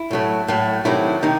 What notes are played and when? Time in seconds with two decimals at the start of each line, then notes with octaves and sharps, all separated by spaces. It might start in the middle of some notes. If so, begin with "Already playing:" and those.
Already playing: E4
0.11 A2 F#3 A3
0.48 A2 F#3 A3
0.85 C3 D#3 F#3 A3 E4
1.22 C3 D#3 D#4